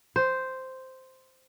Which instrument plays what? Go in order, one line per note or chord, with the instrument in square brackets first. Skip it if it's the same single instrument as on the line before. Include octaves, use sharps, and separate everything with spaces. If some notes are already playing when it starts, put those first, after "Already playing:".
[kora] C5